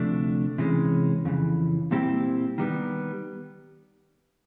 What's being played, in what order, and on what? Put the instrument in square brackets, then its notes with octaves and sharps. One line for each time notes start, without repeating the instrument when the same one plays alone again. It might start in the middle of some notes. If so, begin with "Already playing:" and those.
Already playing: [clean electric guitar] D2 C3 F3 A3 D4
C3 E3 G#3 C#4
F2 C#3 E3
A#2 G3 C4 E4 G4
D#3 G3 B3